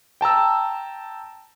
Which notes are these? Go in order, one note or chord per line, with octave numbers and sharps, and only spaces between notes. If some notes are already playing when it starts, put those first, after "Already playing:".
G5 A5 A#5 E6